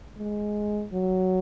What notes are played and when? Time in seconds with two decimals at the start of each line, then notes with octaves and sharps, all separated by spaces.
0.18 G#3
0.93 F#3